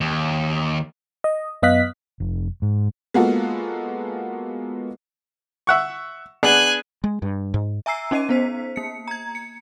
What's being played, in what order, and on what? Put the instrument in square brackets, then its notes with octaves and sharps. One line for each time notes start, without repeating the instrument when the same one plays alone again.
[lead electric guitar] D#2
[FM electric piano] D#5
F#2 B3 D#5 F5 F#6 B6
[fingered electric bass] F1
G#2
[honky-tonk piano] G#3 A#3 B3 F4 F#4 A4
[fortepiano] E5 F#5 C#6
[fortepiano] B3 D4 G#4 [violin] G#5 F#6
[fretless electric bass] G#3
G2
G#2
[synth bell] E5 G#5 A#5 E6 C7
C#4 D#4 D#5 C7 D#7
B3 C5 B6
A#3 C#7
A#5 G#6
C#7